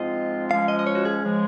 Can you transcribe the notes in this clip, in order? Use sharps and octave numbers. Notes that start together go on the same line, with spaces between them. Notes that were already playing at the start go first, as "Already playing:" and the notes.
Already playing: G#2 F3 G#3 C4 F4 D#5
F3 G#3 C#4 F5
D#5
D#5
C#5
F#4
G#4
C#3 F3 G#3